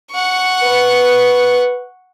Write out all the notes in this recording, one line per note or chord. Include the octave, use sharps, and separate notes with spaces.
F#5 C#6
B4